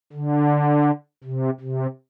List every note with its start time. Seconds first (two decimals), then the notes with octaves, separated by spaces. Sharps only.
0.13 D3
1.24 C3
1.61 C3